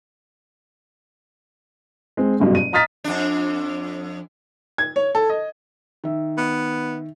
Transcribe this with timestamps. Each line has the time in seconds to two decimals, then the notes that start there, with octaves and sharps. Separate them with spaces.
2.17 G#3 C4
2.40 F#1 G2 B2
2.55 D#7
2.73 D#5 A#5 D#6 F6 A6 B6
3.04 F2 D4
4.78 G#6
4.96 C#5
5.15 A4
5.30 D#5
6.04 D#3 E5
6.37 B3